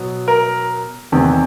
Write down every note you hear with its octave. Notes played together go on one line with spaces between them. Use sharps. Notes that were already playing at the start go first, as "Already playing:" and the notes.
Already playing: B2 F#3 B3
A#4
E2 C3 D#3